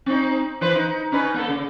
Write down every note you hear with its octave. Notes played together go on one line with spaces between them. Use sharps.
C4 D#4
E3 B4 C5
D#4
C#4 D#4 B4
A#3 A4
C#3